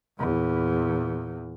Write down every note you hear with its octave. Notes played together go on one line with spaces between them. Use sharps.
E2 A#2